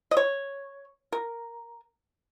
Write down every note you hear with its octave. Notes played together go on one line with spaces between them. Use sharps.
D#5
C#5
A#4